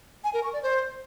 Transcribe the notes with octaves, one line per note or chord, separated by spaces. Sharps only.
G#5
A#4
C#6
D5
C5